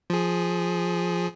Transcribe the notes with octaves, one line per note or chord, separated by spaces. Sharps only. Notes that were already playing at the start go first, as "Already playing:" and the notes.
F3 G#4